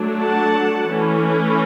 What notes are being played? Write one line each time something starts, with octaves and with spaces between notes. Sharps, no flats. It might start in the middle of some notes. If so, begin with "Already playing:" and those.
Already playing: F#3 A3 D4
F#5 A5
E3 A3 C#4